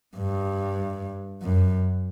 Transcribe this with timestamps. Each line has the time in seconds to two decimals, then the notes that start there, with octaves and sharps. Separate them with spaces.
0.17 G2
1.42 F#2